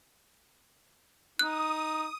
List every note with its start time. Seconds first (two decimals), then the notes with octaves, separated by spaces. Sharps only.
1.39 D#4 D#6 F#6